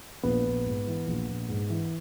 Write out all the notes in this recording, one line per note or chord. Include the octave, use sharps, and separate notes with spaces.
A#1 B3
A#1
G#2
E3
A#1
A#1
G#2
E3